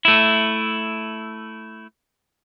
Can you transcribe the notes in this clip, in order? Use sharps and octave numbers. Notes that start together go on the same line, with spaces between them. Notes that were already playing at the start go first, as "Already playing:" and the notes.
A3 E4